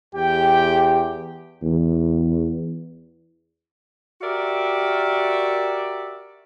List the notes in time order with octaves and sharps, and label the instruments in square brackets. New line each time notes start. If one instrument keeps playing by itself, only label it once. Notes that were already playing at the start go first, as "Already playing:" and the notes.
[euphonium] E2 [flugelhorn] G4 [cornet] G5
[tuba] E2
[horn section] F#4 G4 A#4 D5 E5